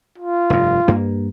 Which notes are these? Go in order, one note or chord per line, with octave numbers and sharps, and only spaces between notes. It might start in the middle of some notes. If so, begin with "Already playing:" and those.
F4
F1 G2
G2 A#3